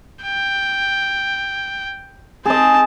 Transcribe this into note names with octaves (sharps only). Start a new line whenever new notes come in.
G5
C4 G#4 D#5 A5